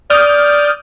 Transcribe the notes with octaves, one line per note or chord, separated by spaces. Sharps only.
D5 D#6 F6 G6